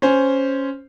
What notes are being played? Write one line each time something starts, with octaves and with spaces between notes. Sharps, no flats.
C#4 C5